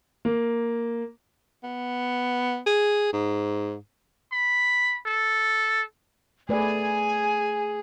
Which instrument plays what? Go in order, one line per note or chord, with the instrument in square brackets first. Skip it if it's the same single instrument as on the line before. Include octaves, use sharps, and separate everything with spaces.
[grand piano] A#3
[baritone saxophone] B3
G#4
G#2
[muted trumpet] B5
A4
[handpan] A3 B4 D5 [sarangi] G#4 [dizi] G#5